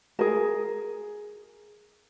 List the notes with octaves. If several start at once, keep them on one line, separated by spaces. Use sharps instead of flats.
G#4 A#4